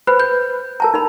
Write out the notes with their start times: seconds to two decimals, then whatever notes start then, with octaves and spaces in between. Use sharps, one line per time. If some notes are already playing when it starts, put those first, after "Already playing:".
0.07 B4 C5 B5
0.20 G6
0.80 A#4 A5 A#5
0.94 D#4 A#4 B5